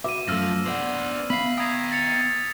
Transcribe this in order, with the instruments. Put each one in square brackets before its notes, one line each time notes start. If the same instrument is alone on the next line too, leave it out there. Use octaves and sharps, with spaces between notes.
[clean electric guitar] F#4 B4 E5 [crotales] D6 D#7
[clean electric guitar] F#2 A3 [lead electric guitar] F3 [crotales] E6 F6 A#6
[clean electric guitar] B3 F5 F#5 [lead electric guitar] D4 C5
[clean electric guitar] B3 E5 F5 [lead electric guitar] B5 [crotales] B6 C7
[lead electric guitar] G5 A#5 [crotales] D#6 G#6 C7
[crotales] A6 C#7 F7